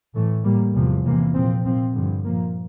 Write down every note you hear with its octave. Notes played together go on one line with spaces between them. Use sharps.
A2 E3 A3
A2 G3 A#3
E2 C3 F3
E2 C3 E3 A#3
A#2 F3 C4
A#2 F3 C4
G2 D3 F3
A#2 F3 A#3